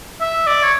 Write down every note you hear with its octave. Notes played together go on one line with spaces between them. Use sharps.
E5
D5
C#5